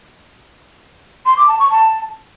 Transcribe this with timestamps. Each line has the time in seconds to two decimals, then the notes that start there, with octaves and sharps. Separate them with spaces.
1.26 C6
1.37 D6
1.48 A5
1.59 C#6
1.70 A5